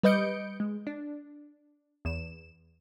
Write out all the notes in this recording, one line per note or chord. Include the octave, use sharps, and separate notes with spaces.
G3 B4 D#5 G6 C#7 D7
G#3
D4
E2 E7